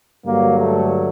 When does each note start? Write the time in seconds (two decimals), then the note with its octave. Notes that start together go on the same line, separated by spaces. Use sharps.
0.24 G2 D3 F#3 A#3
0.57 A3